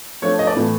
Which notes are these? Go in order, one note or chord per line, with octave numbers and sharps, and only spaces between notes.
F3 A3 D4 C#5
D#5
D5
A2 E3 A3